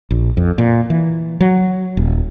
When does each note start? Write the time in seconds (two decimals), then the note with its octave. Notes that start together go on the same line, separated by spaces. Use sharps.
0.11 A#1
0.37 F2
0.58 A#2
0.90 E3
1.41 F#3
1.97 D#1